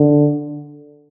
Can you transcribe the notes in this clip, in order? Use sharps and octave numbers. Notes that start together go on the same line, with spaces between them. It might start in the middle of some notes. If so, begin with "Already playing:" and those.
Already playing: D3